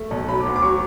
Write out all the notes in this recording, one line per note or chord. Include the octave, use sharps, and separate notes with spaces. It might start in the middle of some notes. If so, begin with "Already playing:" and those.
Already playing: A3
B1
F#3 B5
D2 D6
D6
F#3 C#6